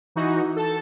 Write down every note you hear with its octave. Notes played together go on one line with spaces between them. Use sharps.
E3 D#4 F#4
A4 A5